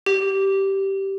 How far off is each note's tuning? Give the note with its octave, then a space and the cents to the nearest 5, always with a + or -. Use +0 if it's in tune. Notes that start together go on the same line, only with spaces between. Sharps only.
G4 -10